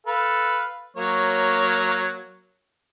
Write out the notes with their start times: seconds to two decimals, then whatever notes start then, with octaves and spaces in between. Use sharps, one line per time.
0.07 A4 B4 F5
0.97 F#3 A#3 C#5